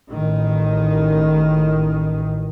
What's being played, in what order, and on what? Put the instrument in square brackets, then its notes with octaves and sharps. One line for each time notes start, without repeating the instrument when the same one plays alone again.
[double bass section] A1 D#3